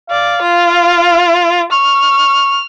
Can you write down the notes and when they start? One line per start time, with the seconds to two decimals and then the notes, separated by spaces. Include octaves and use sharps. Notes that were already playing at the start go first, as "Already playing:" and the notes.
0.11 D5 F5
0.42 F4
1.72 C#6 F6